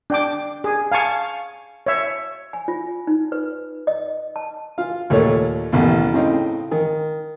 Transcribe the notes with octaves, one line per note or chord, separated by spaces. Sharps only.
D4 G5 D6
G#4
F5 G#5 A5 C#6
C#5 E5
G#5
F4
D#4
B4
D#5
A5
F4 F5
D#2 A#2 A3 C#5
A1 D#2 B2
A2 C#3 C4 D#4
D#3